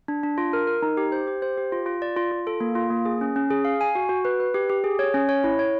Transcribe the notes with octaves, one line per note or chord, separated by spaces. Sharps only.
D4
D4
F4
A#4
A#4
D#4
G4
C5
G4
C5
G4
F4
F4
D5
F4
F4
A4
A#3
F4
A#3
G#4
C#4
C#4
G#4
F5
G#5
F#4
F#4
B4
B4
G4
G4
G#4
C#5
C#4
C#5
E4
C#5